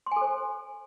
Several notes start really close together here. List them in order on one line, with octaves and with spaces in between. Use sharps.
C6 G#5 A4 C5